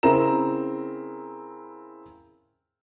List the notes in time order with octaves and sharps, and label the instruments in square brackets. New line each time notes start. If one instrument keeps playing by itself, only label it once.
[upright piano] C#3 C4 E4 A#4 A#5 E7